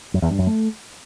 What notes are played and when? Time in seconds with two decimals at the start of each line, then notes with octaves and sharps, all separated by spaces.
0.14 F#2
0.22 E2
0.30 G2
0.39 F#2
0.47 A3